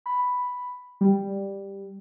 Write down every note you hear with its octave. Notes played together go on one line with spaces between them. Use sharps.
B5
G3